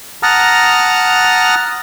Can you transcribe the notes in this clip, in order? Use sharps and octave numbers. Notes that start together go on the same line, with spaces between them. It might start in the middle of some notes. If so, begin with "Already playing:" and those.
F#5 A5 A#5 D#6 F6